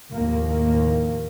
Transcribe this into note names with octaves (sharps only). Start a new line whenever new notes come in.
D#2 A2 D#3 F3 A#3